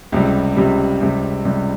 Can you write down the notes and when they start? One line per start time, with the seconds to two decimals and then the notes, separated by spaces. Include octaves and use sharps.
0.12 C#2 C3 G3
0.57 C#2 C3 G3
1.01 C#2 C3 G3
1.45 C#2 C3 G3